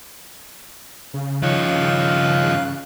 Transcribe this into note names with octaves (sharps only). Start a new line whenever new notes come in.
C#3
G2 D#3 F3 C#5 F5 F#6